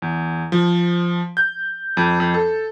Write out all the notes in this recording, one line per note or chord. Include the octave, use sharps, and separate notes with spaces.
E2
F3
G6
F2
F2
A4